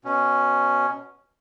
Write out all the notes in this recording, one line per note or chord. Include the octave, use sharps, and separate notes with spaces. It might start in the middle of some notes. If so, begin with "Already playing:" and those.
B2 C#4